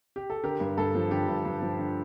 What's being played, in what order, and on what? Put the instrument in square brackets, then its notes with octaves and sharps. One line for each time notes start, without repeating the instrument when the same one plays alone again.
[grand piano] G4
A4
D3 G4 A#4
G2
G2 A4
F3
D3 G4
G2
G2
F3
D3